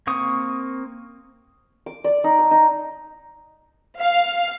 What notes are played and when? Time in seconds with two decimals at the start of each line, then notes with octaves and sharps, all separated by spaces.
0.07 A#3 C4 C#6 D#6
1.86 D6
2.04 D5
2.24 D#4
2.39 A5
2.51 D#4
3.99 F5